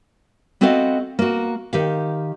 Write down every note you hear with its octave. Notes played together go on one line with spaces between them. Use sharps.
B3 C4 F#4 A4 D#5 F5
A#3 F#4
D#3 G4 F5